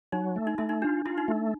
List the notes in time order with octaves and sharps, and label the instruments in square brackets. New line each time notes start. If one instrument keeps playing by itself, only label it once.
[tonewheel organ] F#3 [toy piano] D#4
[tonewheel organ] A3
[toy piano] D#4
[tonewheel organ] A3 [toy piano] E4
[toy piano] D#4
[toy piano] D4 [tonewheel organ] F4
[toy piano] E4 [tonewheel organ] F4
[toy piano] D#4
[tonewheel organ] A3